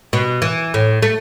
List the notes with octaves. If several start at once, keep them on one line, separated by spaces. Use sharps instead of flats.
B2
E3
A2
A3